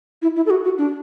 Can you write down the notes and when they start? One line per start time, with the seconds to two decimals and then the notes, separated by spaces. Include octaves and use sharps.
0.22 E4
0.36 E4
0.46 A4
0.50 F#4
0.64 F#4
0.78 D4